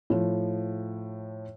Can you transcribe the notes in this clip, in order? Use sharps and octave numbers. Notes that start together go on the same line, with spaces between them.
A2 F3